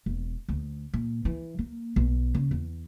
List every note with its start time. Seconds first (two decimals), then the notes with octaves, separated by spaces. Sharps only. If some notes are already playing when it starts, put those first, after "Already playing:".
0.06 E1
0.49 D2
0.94 A#2
1.25 E3
1.59 A#3
1.96 B1
2.34 C#3
2.51 E2